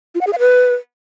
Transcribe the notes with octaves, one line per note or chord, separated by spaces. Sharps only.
F4
F#5
G#4
F5
B4